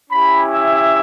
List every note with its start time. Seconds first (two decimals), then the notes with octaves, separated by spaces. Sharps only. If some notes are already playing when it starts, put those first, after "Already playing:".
0.10 C#4 E4 G4 B5
0.54 E5